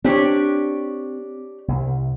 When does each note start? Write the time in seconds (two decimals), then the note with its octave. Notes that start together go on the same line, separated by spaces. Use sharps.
0.04 C4 D4 G4 C#5
1.68 C2